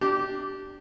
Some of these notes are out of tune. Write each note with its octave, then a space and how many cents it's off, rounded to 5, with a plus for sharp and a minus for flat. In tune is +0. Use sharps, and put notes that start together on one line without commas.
D4 +0 G4 -20